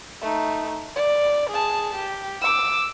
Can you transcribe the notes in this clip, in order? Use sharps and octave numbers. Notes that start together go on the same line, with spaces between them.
A3 D#4
D5
G#4 A5
G4
D6 E6